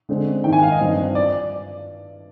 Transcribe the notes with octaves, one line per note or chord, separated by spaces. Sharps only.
D3 G#3 C4
G#2 D#3 A#3 G5
G#5
F5
D#5
G2 F3 C4
D5